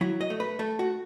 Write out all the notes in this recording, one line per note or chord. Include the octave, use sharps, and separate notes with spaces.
F#3 E4
D#5
A3
B4
A3 A4
F#4